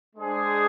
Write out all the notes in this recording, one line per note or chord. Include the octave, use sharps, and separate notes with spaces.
G#3 D4 G#4 C5